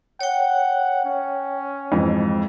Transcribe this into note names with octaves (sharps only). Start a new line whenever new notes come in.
C#5 F#5 G5
C#4
F2 G#2 E3